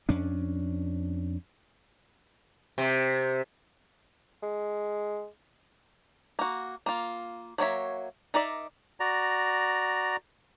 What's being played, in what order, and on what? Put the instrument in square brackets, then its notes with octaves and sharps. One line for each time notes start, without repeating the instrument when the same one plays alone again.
[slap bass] F2 C#4 D4
[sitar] C3
[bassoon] G#3
[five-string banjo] A#3 F#4
A#3 F4
F#3 A#3 C#5 E5
D#4 A#4 D5 E5
[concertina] F#4 D5 A#5